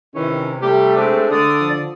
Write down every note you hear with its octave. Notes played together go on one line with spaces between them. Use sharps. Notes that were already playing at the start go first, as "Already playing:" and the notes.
C3 D#3 E3 C#4
G3 A3 G4
G#3 C4 D4
D3 D5 D#6
F3